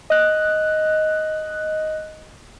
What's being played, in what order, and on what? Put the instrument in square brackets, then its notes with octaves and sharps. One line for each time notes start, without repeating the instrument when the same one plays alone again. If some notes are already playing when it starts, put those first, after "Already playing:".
[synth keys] D#5 F#6